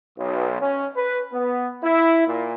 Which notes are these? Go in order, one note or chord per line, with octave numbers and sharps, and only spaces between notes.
B1
C#4
B4
B3
E4
A#2